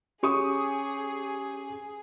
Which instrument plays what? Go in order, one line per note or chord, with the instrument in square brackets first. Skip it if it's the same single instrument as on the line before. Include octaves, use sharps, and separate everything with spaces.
[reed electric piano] C#4 [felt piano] G4 C#6 D#6 [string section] G#4